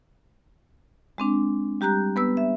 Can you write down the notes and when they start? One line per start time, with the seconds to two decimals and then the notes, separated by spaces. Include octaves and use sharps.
1.18 G#3 C4 D4
1.81 G3 G4 A#5 F#6 G6
2.16 B3 B4 E6
2.37 E5